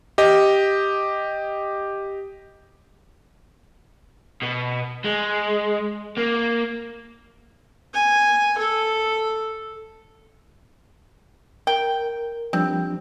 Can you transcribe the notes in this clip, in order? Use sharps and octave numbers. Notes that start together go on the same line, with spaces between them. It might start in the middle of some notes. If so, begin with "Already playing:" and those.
G4 D#5
B2
G#3
A#3
G#5
A4
A#4 G5
F3 G3 C4 D4